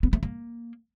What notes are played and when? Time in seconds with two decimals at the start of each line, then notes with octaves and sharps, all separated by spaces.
0.03 B3
0.13 A3
0.23 A#3